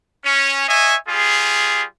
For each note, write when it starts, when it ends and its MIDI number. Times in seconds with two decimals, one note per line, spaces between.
0.24 0.64 61
0.68 0.96 73
0.68 0.96 75
0.68 0.96 76
0.68 0.96 80
1.08 1.83 55
1.08 1.83 65
1.08 1.83 68